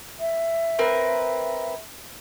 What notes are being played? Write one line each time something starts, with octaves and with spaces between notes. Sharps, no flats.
E5
C4 A#4 B4